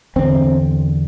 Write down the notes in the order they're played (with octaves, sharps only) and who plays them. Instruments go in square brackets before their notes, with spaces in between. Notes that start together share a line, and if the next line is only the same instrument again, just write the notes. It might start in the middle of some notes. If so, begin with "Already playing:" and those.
[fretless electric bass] E2 D3 C4